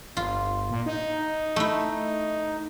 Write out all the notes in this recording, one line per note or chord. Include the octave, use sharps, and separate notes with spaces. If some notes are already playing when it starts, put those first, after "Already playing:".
G1 F4
A#2
D#4
A3 E4